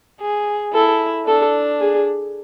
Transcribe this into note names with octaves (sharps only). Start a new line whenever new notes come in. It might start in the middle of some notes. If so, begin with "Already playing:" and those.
G#4
E4 A4
D4 A4
G#4